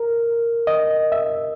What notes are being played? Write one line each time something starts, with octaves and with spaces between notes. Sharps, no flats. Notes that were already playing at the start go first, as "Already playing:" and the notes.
Already playing: A#4
D#5
E5